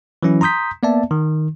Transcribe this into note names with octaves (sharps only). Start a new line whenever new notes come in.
E3 F#3 C#4 E4
A#5 C6 D#6 G6 B6
A#3 B3 D5 E5 A5
D#3